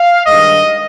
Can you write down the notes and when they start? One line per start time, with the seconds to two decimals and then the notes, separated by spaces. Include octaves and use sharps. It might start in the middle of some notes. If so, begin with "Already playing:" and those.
Already playing: F5
0.26 G2 D#3 G#3 D#5